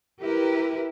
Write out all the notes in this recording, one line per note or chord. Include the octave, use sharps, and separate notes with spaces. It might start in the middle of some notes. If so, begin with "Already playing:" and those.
E4 G4 A#4 B4